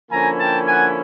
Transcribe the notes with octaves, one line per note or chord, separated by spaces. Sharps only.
D3 F3 A#3 C#4 E4 G#5 A#5
G5 A5
F#5 G#5